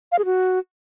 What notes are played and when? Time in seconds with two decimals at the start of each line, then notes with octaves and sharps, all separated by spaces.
0.12 F5
0.19 G#4
0.25 F#4